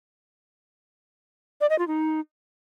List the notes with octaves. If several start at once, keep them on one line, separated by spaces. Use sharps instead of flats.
D5
D#5
F4
D#4